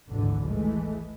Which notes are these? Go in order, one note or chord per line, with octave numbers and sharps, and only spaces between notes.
G#1 D2 G#2 D3 E3
E3 G#3 A3